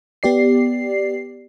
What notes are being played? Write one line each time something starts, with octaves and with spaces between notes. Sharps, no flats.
B3 G4 D5 C7